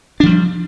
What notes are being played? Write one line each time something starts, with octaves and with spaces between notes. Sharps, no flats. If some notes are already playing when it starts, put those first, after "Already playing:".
E3 F3 G3 D4